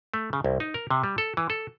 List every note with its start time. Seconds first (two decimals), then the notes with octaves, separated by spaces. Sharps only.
0.14 A3
0.33 C#3
0.44 C2
0.60 D#4
0.74 A#4
0.90 C3
1.04 G3
1.18 A4
1.37 E3
1.50 A4